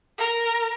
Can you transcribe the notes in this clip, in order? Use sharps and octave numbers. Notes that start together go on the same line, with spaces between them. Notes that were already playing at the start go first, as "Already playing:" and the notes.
A#4